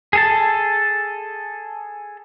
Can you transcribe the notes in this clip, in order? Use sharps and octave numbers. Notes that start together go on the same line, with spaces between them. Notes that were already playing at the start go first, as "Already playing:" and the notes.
G#4 A4 A5